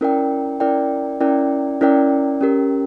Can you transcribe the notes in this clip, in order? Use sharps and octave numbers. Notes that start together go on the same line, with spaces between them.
C#4 E4 A#4 D5 G5
C#4 E4 A#4 D5 G5
C#4 E4 A#4 D5 G5
C#4 E4 A#4 D5 G5
C#4 G4 A#4